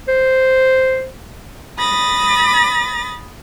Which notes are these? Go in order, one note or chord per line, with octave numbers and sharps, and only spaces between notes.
C5
B5 D#6 A6 A#6